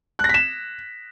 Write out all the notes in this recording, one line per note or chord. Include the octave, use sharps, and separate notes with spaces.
F#6
A#6
B6
E7